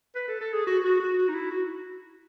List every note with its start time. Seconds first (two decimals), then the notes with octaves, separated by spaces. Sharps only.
0.16 B4
0.28 A4
0.41 A4
0.53 G#4
0.67 F#4
0.84 F#4
1.00 F#4
1.17 F#4
1.29 D#4
1.35 E4
1.51 F#4